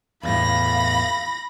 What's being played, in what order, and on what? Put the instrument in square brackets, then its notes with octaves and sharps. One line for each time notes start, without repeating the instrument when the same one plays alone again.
[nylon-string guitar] E2 A2 [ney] F5 [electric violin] B5 A#6